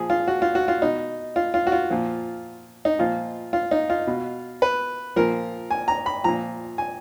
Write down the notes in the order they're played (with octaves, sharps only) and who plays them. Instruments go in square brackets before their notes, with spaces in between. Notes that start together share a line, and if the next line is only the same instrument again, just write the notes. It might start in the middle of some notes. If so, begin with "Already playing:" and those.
Already playing: [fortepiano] A#2 F3 G#4
F4
F#4
F4
F#4
F4
B2 D#4
F4
F4
F#4
F4
A#2 F3
D#4
A#2 F3 F4
F4
D#4
F4
B2
B4
A#2 F3 A#4
G#5
A#5
B5
A#2 F3 A#5
G#5